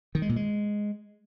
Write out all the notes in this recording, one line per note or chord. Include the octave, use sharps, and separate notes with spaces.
D#3
G#3
A#2
G#3